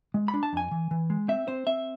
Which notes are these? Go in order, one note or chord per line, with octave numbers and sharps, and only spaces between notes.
G#3
B5
D4
A5
F2 G#5
E3
E3
G#3
C4 E5
C4 C5
C4 E5